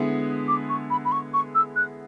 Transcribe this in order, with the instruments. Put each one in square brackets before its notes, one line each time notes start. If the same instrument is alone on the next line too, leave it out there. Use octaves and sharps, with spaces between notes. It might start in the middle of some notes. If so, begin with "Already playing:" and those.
Already playing: [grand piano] D3 G#3 B3 E4 G#4
[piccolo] D6
C#6
B5
B5
C#6
C#6
E6
F#6